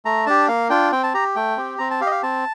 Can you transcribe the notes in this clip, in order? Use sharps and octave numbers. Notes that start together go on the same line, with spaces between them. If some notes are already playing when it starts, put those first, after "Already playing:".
A3 A#5
D4 G4 A5
A#3 F5
D4 F4 G5
C4 G5
A5
G4 A#5
A3 G5
C4 G4
C4 A#5
A5
G4 F5
D#5
F5
C4 A5